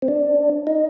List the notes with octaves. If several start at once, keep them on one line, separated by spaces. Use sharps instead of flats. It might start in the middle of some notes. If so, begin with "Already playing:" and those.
C4
D4
D#4